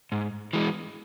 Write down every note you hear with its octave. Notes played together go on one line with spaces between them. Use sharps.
G#2
E3 G#3